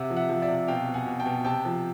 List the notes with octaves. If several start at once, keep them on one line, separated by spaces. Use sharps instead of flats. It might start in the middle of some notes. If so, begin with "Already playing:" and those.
Already playing: C3 E5 F#5
F3
E5 F#5
F3
D5 E5
C3
B2 F5 G5
B2
F#5 G#5
B2
G5 A5
B2
C3 G5 A5
F3